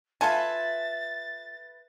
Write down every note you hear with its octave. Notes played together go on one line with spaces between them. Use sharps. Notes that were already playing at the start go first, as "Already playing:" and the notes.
F4 A4 B4 E5 G#5 A5 A6